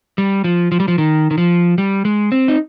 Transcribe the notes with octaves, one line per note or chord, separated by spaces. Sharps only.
G3
F3
F3
G3
F3
D#3
D#3
F3
G3
G#3
C4
D#4